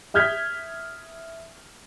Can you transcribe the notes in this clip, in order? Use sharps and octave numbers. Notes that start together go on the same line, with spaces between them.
E5 D#6 F6 G6 G#6 B6